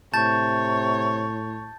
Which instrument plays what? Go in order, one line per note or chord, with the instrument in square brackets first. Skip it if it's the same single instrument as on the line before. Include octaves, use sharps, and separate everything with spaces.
[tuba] A2 [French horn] C3 [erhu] C#5 [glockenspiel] A5 G6 A6